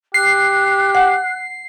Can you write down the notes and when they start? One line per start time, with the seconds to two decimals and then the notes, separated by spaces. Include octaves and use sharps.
0.14 G4 F#6 C7
0.95 F#5